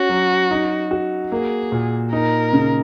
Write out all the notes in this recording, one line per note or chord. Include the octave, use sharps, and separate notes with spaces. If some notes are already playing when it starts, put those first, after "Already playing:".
Already playing: C#4 F#4
F#3
D#4
F#4
A#3 G#4
A#2
D#4 A#4
C#3